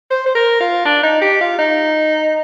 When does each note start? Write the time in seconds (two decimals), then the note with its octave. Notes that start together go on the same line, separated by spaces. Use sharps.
0.11 C5
0.26 C5
0.35 A#4
0.60 F4
0.85 D4
1.03 D#4
1.22 G4
1.41 F4
1.59 D#4